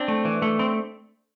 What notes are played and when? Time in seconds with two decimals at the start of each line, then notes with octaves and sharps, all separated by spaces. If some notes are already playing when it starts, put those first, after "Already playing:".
Already playing: C4 D4
0.08 A3
0.25 E3
0.42 A3
0.59 C4